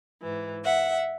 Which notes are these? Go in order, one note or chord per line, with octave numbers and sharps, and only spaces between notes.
G#2 E3
E5 F#5